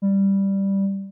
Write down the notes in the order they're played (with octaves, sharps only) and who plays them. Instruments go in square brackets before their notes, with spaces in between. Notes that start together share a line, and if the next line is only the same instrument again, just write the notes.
[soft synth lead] G3